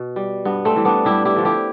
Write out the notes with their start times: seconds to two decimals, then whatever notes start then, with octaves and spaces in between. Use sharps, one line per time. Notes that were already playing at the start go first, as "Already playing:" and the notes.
Already playing: B2
0.16 G3
0.45 G2 B3
0.65 A3 C4
0.76 E3 G3
0.85 B3 D4
1.05 G2 E4 G4
1.25 E4 G4
1.36 D3 F3
1.45 E4 G4